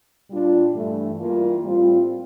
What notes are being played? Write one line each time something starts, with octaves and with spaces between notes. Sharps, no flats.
A#2 G3 D4 F4
G2 E3 A3
E3 G3 A#3 F4
A2 G3 C4 F4